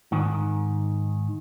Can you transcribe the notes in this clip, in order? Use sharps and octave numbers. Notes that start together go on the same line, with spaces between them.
G#2 D#3